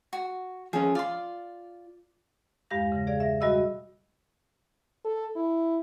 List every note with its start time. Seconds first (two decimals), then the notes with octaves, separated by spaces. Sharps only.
0.13 F#4
0.73 F3 C#4 G#4
0.95 F4 D5 C6
2.70 E2 G2 G#3 G4 F5 A#6
2.92 C#3 E3 A#6
3.07 G#4 D5 F5
3.20 E5 A#6
3.41 B2 G3 F#4 D#5 B5 E6
5.05 A4
5.36 E4